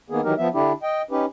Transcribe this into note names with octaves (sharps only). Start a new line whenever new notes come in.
D#3 A#3 B3 G#4
D#3 E3 F#3 D#4 G4 A#4
F3 B3 E5
D3 D4 E4 G4
D#5 G5
C#4 D#4 G4 B4